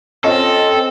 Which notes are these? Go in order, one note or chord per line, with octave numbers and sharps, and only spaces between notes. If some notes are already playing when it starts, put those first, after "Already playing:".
C4 C#4 F4 A4 D#5